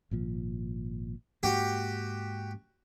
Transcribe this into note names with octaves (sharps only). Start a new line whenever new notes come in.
G#1 A#2 F3
G#2 A#3 F#4 G4